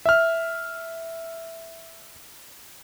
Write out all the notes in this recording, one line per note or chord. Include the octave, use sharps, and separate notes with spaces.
E5 F6